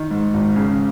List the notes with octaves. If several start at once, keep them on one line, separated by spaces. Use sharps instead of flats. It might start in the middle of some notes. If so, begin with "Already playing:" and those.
Already playing: D#3
G#2
G#1
C#3